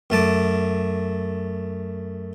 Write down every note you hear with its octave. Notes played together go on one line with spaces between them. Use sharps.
F#2 A3 A5 D6